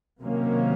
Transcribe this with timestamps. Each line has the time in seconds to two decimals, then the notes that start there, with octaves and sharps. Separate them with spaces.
0.21 C3 D#3 F#3 A#3 C#4